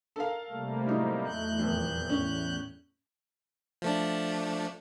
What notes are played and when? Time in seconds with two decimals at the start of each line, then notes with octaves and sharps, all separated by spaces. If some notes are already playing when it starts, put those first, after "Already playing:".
0.16 A4 A#4 F5
0.50 C3 G3 A3 A#3
0.86 A2 F#3 D#4
1.25 E2 F#6 G6
1.59 D#1 F2
2.10 A2 C#4
3.82 F3 A3 D4